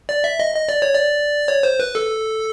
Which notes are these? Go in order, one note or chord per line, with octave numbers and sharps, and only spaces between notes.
D5
E5
D#5
D#5
D5
C#5
D5
C#5
C5
B4
A4